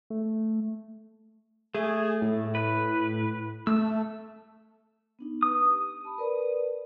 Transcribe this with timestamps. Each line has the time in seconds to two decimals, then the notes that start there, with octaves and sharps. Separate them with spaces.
0.10 A3
1.74 A3 G#4
2.22 A2
2.55 B4
3.67 A3 E6
5.19 B3 D4 D#4
5.43 B4 D#6
5.68 G4
6.05 A5 B5
6.18 A#4 B4 D5